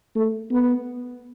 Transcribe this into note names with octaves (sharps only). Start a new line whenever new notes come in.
A3
B3